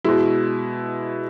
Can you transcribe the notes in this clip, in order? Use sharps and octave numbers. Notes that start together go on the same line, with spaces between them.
B2 G#3 E4